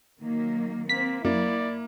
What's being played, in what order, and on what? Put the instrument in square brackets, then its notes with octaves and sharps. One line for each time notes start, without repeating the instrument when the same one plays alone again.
[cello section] D#3 F#3 A#3
[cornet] A#3 [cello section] C4 [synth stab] B6
[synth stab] F#2 [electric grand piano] A#3 [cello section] E4 [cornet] D5